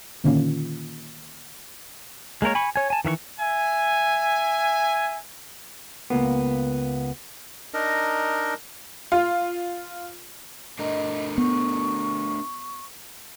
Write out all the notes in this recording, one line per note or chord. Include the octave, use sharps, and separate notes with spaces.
A#2 D3 D#3 A#3 C#4 F4
G#3 A#3 A#4 C#5
G#5 B5 C#6
C#5 G#5
G#5 A5
D#3 E3 E5 C#6
E5 G#5
C#2 A#3 B3
D4 D#4 A#4 D#5
F4
A3 D4 A#4 D#5
B3 C#6